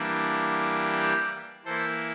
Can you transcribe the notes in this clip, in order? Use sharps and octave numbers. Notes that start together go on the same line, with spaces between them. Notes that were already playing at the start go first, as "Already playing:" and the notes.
Already playing: E3 G3 A#3 D4
G4
E3 A#3 E4 A4 C5